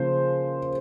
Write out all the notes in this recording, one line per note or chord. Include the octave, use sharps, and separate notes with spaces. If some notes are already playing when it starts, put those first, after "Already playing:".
Already playing: C#3 F3 A#3 C5